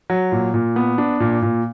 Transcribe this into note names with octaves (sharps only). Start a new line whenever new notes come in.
F#3
A#2
A#2
B3
D4
A#2
A#2